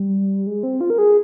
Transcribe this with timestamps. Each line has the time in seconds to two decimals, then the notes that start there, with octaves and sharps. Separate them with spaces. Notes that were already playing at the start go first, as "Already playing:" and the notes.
Already playing: G3
0.47 G#3
0.63 C4
0.81 F4
0.90 A#4
0.98 G#4